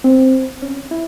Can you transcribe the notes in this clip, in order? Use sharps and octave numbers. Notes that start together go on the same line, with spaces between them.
C4
C#4
E4